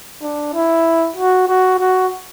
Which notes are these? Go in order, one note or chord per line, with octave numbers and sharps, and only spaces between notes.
D4
E4
F#4
F#4
F#4